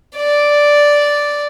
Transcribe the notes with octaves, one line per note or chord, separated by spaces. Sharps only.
D5